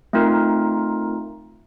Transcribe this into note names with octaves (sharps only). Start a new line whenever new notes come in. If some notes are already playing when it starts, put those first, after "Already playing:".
A3 C4 D#4 F4 A#4